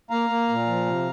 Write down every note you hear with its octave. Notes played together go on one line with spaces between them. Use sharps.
A#3 F5 A#5
A#3
A#2
F3
C3